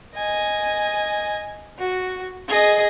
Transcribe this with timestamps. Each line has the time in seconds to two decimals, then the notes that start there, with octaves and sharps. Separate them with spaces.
0.15 D#5 G#5
1.78 F#4
2.48 G#4 D#5